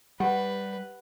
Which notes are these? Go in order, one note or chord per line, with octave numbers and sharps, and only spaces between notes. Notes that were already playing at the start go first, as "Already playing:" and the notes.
G3 G4 B4 F#5